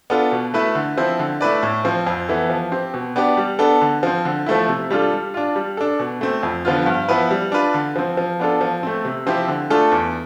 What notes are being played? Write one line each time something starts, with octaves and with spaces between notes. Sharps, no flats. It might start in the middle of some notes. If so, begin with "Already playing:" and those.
B3 D4 F4 A4
B2
A3 E4 B4
D3
F3 C4 E4
D3
A3 E4 B4 D5
A2
F3 C4
F2
E3 B3 E4 A4
F3
C4 G4
B2
B3 D4 G4 D5
G3
B3 D4 A4
D3
F3 C4
D3
F3 A3 E4
C3
G3 D4 F4 A4
G3
D4 F4
G3
D4 A4
B2
A3 C4
F2
D3 F3 B3 F4
G2
F3 B3 E4 B4
G3
D4 F4 B4
D3
F3 C4
F3
B3 D4 F4 A4
F3
A3 C4
C3
F3 C4 E4 G4
D3
A3 D4 F4 A4
E2